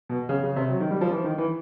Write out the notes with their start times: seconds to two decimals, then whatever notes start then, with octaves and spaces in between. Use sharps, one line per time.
0.09 B2
0.29 C#3
0.43 C#3
0.56 C3
0.70 F#3
0.80 D#3
0.91 G3
1.01 F3
1.11 E3
1.24 D#3
1.38 E3